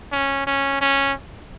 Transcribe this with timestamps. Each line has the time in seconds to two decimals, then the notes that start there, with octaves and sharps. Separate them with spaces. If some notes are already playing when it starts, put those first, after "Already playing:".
0.12 C#4
0.47 C#4
0.81 C#4